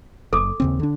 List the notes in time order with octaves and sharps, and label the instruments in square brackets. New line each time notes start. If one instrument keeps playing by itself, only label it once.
[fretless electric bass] F#1 [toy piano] A4 D6
[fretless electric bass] D#2 C#3 C4
D3 D4